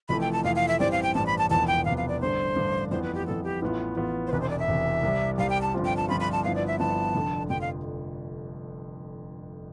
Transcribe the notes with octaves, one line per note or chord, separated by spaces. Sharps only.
F1 F2 E3 A3 B5
G5
A5
F1 F2 E3 A3 F5
F5
E5
A1 G2 E3 G3 C4 D5
F5
G5
A1 G2 E3 G3 C4 A5
B5
A5
E1 E2 C3 F3 B3 A5
G5
E1 E2 C3 F3 B3 F5
F5
D5
A1 G2 D3 C5
A1 G2 D3
F2 E3 B3 C5
B4
G4
F2 E3 B3 A4
G4
A1 A2 E3 B3 F4
A1 A2 E3 B3 F4
C5
E1 E2 C3 B4
C5
D5
E5
E1 E2 C3
C2 C3 G3
C2 C3 G3 F5
G5
A5
G1 G2 F3 C4 F4
G5
A5
G1 G2 F3 C4 F4 B5
B5
A5
G1 G2 F3 B3 E4 F5
D5
E5
G1 G2 F3 B3 E4 A5
F1 F2 D3
F1 F2 D3 G5
F5